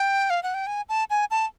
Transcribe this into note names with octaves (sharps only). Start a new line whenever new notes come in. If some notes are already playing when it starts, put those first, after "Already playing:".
Already playing: G5
F5
F#5
G5
G#5
A5
G#5
A5